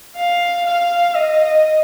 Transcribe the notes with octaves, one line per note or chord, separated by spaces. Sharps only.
F5
F5
D#5